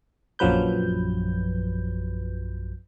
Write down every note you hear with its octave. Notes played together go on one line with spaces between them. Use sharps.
A#1 F#2 F3 F#3 B4 G6